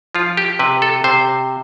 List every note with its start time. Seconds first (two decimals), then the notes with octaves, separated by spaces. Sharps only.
0.15 F3 F4
0.37 G4
0.59 C3 B4
0.82 A4
1.04 C3 C5